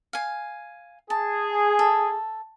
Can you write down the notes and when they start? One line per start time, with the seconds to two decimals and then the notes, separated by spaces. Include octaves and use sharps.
0.13 F5 G#5
1.10 G#4 A5
1.79 A4